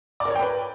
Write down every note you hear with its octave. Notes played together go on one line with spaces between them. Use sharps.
D5
A#4
C#5
G5
B4